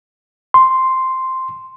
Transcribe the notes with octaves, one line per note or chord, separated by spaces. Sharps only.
C6